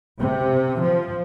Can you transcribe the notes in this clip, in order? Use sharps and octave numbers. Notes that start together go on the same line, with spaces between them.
C3
F3